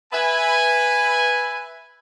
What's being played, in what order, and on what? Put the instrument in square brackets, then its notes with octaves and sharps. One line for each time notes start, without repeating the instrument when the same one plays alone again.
[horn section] B4 E5 G#5